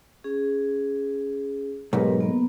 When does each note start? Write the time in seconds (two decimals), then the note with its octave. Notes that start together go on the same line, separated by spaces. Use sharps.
0.24 C#4 G#4
1.93 B1 G#2 G4 A#4 B4
2.20 A#3 B3